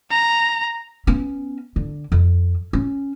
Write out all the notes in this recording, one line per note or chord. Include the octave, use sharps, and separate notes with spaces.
A#5
B3 C#4
D3
F2
C#4